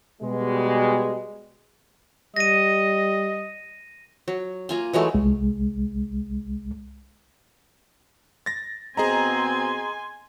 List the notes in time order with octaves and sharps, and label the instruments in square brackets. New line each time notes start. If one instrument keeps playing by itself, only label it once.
[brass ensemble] B2 G3 G#3
[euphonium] G3 [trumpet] D#5 [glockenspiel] A#6 D#7
[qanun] F#3
A#3 F4 G#5
E3 F#3 G#3 A3
[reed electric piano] C2 G#3
[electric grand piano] A6 A#6
[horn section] B2 C4 [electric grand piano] G#4 D#5 A#5 [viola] G#5 C6